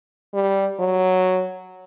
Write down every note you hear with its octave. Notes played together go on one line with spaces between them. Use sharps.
G3
F#3